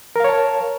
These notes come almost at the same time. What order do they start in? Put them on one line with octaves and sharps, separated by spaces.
A#4 F5 C#5 A5